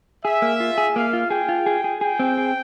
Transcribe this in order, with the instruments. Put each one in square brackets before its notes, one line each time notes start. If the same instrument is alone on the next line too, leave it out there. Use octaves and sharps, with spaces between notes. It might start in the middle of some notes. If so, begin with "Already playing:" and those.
[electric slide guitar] G#4 [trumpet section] E5
[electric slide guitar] A#3
F4
G#4
[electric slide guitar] A#3 [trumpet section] F5
[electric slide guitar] F4
[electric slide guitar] G#4 [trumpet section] G5
[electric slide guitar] F4
G#4
G#4
[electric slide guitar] G#4 [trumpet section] G5
[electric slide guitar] C4
G#4